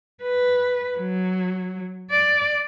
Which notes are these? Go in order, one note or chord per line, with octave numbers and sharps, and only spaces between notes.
B4
F#3
D5